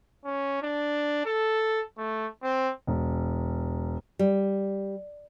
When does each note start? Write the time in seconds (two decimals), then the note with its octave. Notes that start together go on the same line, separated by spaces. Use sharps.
0.25 C#4
0.62 D4
1.25 A4
1.97 A3
2.42 C4
2.87 E1
4.19 G3